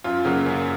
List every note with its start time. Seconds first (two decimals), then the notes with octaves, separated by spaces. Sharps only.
0.04 F#2 F4
0.25 C#3 F#3 A#3
0.46 F#2